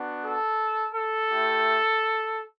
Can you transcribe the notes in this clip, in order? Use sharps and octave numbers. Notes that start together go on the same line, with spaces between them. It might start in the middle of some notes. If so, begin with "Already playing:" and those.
Already playing: B3 D4 F#4
A4
A4
A3 E4 G4